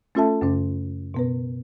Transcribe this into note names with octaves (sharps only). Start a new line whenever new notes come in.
A3 C#4 F4 A4 E5 A5
F#2 C#3 C#4
B2 B3 B4